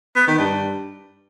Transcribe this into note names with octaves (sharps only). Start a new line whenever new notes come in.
B3
D#3
G2